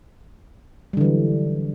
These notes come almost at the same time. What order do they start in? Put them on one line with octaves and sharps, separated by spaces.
G3 D3 E3 F#3